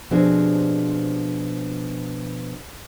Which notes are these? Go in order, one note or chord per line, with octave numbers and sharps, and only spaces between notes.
B2 F3 C4 D4 G4 G#4